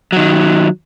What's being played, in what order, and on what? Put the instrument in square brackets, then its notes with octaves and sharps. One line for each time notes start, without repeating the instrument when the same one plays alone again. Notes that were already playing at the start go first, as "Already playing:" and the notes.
[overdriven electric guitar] D#3 F#3